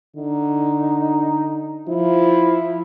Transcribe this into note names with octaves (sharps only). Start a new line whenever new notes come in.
D3 D#4
F3 E4